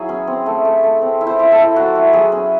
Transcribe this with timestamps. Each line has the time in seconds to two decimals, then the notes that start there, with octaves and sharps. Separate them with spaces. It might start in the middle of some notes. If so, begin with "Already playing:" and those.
Already playing: F#3 E4 G#4 C#5
0.09 C#4
0.27 C4
0.46 A3
0.65 A3
0.83 A3
1.02 C4
1.21 E4
1.27 C5
1.39 E4
1.52 A4
1.58 E4
1.76 F#3 F#4
1.95 E4
2.13 F#3 G#4
2.32 C#4